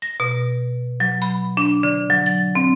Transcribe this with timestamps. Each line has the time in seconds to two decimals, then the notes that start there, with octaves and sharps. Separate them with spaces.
0.02 A#6
0.20 B2
1.00 F#3
1.22 B5
1.57 D4
1.83 D3
2.10 F#3
2.26 A6
2.55 C4